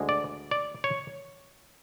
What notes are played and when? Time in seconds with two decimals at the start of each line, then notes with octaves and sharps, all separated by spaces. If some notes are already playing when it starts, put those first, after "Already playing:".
Already playing: D2 D3 G#3
0.09 D5
0.51 D5
0.84 C#5